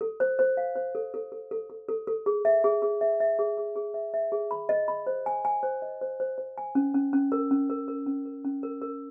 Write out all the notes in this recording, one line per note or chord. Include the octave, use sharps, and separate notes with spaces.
A4
C5
C5
F5
C5
A4
A4
A4
A4
A4
A4
A4
G#4
E5
G#4
G#4
E5
E5
G#4
G#4
G#4
E5
E5
G#4
B5
D#5
B5
C5
G#5
G#5
C5
D#5
C5
C5
C5
G#5
C#4
C#4
C#4
A#4
C#4
A#4
A#4
C#4
A#4
C#4
A#4
A#4